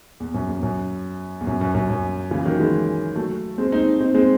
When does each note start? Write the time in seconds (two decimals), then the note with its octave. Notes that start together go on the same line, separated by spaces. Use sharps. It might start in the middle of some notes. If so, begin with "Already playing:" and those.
0.20 E2
0.34 F#2
0.48 E2
0.63 F#2
1.41 E2
1.47 F#2
1.61 F#2
1.75 F#2
1.89 F#2
2.31 C#3 E3
2.45 D#3 F#3
2.60 E3 G#3
3.16 F#3 A3
3.58 G#3 C4
3.72 C4 D#4
4.01 C4 D#4
4.14 G#3 C4